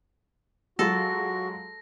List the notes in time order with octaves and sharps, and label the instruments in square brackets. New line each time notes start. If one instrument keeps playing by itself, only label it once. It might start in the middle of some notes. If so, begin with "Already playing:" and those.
[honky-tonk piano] F#3 G#3 F4 [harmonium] F#4 [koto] A4 [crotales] A#6